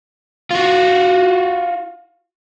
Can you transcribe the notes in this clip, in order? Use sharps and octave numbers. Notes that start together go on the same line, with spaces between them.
F4 F#4